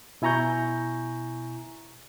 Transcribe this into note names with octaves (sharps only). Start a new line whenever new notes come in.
B2 E4 G#5 A#5 C#6 G6